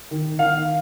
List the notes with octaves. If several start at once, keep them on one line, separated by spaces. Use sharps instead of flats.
D#3
D#3 F5